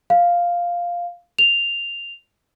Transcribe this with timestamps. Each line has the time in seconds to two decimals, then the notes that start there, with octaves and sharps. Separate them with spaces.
0.10 F5
1.39 F7